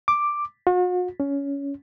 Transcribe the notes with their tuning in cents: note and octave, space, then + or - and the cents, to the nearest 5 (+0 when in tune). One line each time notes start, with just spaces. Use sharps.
D6 +5
F#4 -45
C#4 +15